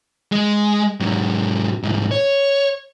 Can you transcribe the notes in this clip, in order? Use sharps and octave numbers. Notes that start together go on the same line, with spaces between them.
G#3
G#2 F#3
C2 G#2
C#5